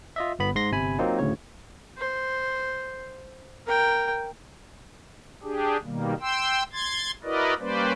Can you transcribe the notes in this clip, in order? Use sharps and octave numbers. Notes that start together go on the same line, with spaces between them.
F4 D#5 E5
G1 B3 B5
G#2 C6 A#6
G1 C3 G#5 B5
F#3 A#3 C4 D#4 F4
D2 A2 C#3 C#5
C5
A#4 G5
D4 G4 G#4
B2 D#3 G3 A#3
G5 C6 E6
C6 G#6 A6
E4 F#4 A#4 B4 D5 D#5
G3 A#3 C#4 B4 C5 D5